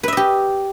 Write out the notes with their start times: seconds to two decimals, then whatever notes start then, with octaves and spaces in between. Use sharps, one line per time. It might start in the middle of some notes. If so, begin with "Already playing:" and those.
0.03 B4
0.08 E5
0.13 D#5
0.17 G4